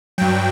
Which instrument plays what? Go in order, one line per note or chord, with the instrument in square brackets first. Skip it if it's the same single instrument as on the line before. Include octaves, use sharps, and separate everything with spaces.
[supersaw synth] G2 F#3 G5